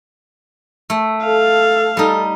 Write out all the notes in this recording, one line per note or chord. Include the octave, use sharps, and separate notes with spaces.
A3
A4 F5
G3 D#4 A4